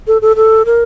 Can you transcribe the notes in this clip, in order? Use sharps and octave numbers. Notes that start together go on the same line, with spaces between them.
A4
A4
A4
A#4